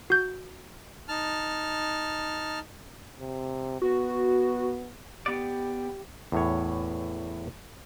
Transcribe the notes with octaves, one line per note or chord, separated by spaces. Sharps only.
F#4 G6
D#4 A5 F6
C3
B3 F#4
B3 G4 D5
E2 A2 C#5